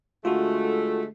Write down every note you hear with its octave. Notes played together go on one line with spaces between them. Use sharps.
D3 G#3 A3 F4 F#4